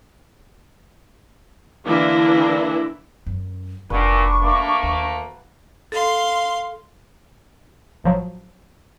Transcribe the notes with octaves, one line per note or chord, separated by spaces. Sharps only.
D3 E3 A#3 D4 E4
F#2
F1 A#2 D4 B4 F#5 C#6
D2 A3 A#3
D#2
A4 F5 C6
A1 F3 F#3